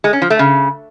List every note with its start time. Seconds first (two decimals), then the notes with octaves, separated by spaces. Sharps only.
0.04 G#3
0.13 C#4
0.22 F3
0.30 A3
0.39 C#3